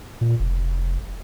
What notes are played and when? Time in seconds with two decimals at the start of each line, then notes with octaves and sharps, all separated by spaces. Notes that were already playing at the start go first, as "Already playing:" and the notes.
0.21 A#2
0.40 F1